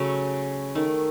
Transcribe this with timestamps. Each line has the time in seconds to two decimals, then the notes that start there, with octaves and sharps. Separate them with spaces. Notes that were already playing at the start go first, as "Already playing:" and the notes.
Already playing: C#3 F#3 A3 F#4
0.75 D#3 A3